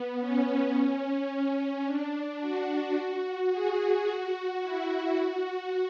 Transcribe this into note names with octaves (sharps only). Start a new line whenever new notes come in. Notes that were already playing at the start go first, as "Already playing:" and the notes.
Already playing: B3
C#4
D4
F#4
G#4
F#4
E4
F#4